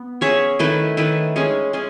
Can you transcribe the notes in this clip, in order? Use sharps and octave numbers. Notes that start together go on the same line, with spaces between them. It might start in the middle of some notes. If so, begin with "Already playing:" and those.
Already playing: B3
C#4 G#4 C#5 E5
D#3 A3 E4 B4
D#3 A3 E4 B4
G#3 C#4 G#4
G#3 C#4 G#4